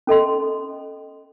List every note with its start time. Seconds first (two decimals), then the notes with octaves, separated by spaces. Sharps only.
0.07 C#4 A4 D#5 C6